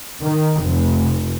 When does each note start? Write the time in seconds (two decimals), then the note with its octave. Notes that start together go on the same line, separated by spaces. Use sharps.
0.22 D#3
0.62 F1